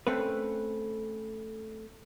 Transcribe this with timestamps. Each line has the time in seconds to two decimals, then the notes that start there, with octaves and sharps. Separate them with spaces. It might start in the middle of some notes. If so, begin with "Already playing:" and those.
0.07 A3 C4 C#4 B4